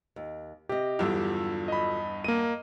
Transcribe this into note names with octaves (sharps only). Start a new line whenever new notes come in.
D#2
C3 G4 D#5
E2 G2 D3 F#3 F4 E6
D#5 B5
A#3 D#5 D#7